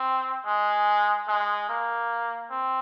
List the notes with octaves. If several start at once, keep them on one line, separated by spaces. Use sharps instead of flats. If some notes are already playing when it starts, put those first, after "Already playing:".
Already playing: C4
G#3
G#3
A#3
C4